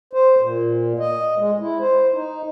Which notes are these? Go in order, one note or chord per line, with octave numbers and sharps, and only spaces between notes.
C5
A#2
D#5
G#3
E4
C5
D#4